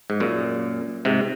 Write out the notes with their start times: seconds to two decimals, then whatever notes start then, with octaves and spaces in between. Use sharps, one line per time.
0.10 G#2
0.20 F#2 A#2
1.05 G#2 C3